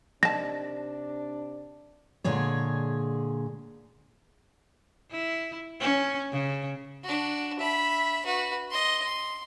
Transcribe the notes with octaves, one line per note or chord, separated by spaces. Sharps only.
C3 D#3 D4 D5 A5 A#6
A#2 D3 G#3 G#4 C#5
E4
C#4
C#3
D4 F#4
E5 B5
F#4 B4
D#5 C6
C6